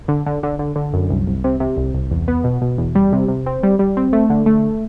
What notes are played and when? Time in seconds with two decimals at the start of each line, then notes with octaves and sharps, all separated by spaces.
0.08 D3
0.26 D3
0.43 D3
0.59 D3
0.76 D3
0.93 F#2
1.10 C2
1.27 C2
1.44 C3
1.60 C3
1.77 C2
1.94 C2
2.11 E2
2.28 B3
2.44 B2
2.62 B2
2.78 E2
2.95 G3
3.13 C3
3.28 C3
3.46 C4
3.63 G3
3.79 G3
3.97 C4
4.13 A3
4.30 D3
4.46 A3